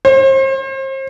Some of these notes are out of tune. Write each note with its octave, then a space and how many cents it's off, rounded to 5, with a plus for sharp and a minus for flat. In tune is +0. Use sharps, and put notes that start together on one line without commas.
C5 +40